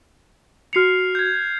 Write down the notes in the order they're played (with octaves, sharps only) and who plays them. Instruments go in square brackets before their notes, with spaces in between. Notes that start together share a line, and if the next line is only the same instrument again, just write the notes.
[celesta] F#4 C#7 [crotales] F6 C7 F7
[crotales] G6 G#6